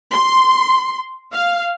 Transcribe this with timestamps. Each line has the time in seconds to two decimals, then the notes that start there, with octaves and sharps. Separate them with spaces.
0.14 C6
1.34 F5